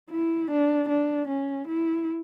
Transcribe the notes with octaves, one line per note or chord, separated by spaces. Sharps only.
E4
D4
D4
C#4
E4